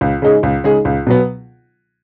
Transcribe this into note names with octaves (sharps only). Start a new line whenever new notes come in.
C#2
C#3 G#3 D#4 G#4
C#2
C#3 G#3 D#4 G#4
C#2
B2 F#3 B3